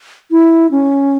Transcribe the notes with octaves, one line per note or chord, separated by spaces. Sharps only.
E4
C#4